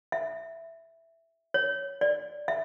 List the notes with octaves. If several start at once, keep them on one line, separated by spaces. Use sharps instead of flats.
E5
C#5
D5
E5